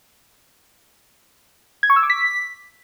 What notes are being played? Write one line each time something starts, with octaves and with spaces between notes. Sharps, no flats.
G#6
C#6
E6
D6
B6